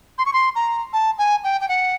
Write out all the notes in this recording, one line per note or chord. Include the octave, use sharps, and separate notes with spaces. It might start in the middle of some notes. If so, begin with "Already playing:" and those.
C6
C#6
C6
A#5
A5
G#5
G5
G5
F#5